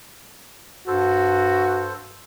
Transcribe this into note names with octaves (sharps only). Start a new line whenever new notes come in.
G2 F#4 A4 C5